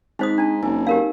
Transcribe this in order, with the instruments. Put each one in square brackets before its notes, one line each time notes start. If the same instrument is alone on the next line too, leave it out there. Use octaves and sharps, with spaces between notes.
[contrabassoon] G#2 [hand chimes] C4 B6 [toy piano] D#4 C5 D#6
[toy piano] D4 A5 [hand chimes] A#5
[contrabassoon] F#1 [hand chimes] C4 D#4 G#5
[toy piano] G4 A#4 F5